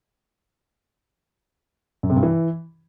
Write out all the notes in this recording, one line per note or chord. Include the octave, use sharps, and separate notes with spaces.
F#2
C3
G2
E3